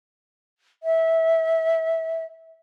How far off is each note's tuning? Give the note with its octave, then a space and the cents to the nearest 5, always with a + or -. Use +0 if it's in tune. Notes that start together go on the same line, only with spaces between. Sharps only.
E5 -20